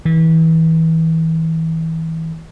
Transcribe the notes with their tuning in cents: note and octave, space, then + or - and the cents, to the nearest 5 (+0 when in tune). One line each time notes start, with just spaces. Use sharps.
E3 -30